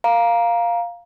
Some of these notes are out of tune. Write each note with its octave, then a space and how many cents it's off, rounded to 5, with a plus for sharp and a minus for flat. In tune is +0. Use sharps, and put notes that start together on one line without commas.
F5 +0 A#5 +15